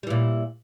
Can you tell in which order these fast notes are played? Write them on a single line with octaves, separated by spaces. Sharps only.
G3 E3 A#2